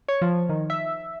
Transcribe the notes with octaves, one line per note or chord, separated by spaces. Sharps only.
C#5
F3
D#3
E5